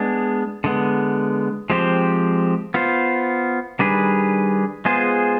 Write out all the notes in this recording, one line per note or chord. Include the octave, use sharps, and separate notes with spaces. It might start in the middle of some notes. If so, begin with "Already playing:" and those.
Already playing: G#3 B3 D4
D3 G#3 B3
F3 G#3 C4 G4 C5
B3 F4 C5
D#3 G3 D4 G#4 B4
G#3 B3 F4 G#4 C5